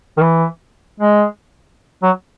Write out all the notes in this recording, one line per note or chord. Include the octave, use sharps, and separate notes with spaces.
D#3
E3
G#3
F#3